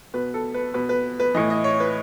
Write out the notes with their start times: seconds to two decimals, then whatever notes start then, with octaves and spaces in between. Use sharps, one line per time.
0.14 B2 B4
0.34 A4
0.54 B4
0.74 B2 B4
0.89 B4
1.20 B4
1.34 A2 E3 D#5
1.50 D#5
1.64 C#5
1.80 B4